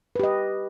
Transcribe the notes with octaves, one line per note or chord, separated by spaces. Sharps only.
G4 B4 D#5